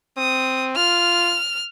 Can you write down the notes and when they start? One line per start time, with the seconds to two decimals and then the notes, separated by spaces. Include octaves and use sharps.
0.17 C4 D#6
0.76 F4 F6